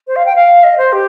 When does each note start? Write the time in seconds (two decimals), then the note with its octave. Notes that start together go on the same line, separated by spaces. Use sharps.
0.07 C5
0.16 F5
0.26 G5
0.36 F5
0.64 D#5
0.78 C5
0.93 G4